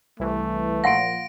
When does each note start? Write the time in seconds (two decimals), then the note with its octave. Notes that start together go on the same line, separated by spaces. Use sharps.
0.20 C2 E3 A3
0.84 A#2 F3 F5 F#5 C6 A#6 D7